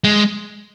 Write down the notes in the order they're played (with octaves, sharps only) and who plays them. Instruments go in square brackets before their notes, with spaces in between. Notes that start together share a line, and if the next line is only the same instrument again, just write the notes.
[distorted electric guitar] G#3